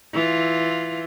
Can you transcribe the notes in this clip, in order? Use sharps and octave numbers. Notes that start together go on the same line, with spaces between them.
E3 F4